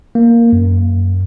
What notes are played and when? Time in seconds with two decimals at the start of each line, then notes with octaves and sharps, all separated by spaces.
0.15 A#3
0.53 F#2